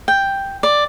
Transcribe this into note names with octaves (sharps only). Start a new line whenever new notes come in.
G5
D5